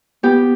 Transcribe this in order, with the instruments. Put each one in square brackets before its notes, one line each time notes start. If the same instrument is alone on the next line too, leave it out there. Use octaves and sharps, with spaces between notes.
[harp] B3 G4